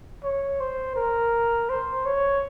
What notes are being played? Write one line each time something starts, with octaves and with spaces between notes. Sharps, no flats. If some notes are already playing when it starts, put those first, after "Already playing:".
C#5
C5
A#4
C5
C#5